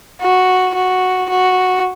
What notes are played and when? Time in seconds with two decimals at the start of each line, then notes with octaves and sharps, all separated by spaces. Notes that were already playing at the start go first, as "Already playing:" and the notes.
0.21 F#4
0.75 F#4
1.30 F#4